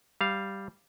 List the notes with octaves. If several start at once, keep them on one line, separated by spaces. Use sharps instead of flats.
G3 F5